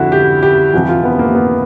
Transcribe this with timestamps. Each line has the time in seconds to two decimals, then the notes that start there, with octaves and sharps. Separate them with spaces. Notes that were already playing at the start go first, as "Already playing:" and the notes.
Already playing: F2 D3 E4 F#4
0.12 G4
0.43 G4
0.73 F2 C3 E3 F#4
0.89 F4
1.04 B3
1.19 A#3
1.35 B3